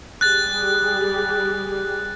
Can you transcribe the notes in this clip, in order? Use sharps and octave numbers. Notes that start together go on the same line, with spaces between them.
G3 G4 G#4 F#6 A6